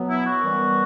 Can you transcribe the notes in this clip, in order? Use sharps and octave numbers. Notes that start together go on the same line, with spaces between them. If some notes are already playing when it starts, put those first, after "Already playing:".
Already playing: B2 F#3 B3
E4
F#4
F#2 E3 G3 B3